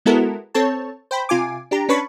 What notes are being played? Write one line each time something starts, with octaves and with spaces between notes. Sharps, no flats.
G#3 B3 E4 F#4 A4 A#4
C4 A4 C#5 A5
C5 G5 B5
C3 F4 G#5 D6
D4 G4 A#5
C#4 D4 B4 A5 B5 C#6